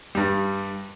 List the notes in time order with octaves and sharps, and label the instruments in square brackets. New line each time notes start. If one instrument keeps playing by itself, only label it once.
[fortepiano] G2 G3